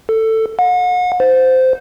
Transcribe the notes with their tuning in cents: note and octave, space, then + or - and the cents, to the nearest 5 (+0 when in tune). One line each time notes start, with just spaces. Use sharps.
A4 +15
F#5 -40
C5 -15